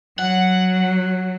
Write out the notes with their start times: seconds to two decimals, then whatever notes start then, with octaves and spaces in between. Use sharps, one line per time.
0.19 F#3 F#5